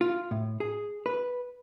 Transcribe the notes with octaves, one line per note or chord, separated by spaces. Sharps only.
F4
A2
G#4
B4